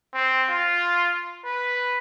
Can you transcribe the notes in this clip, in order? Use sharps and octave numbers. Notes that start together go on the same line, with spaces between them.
C4
F4
B4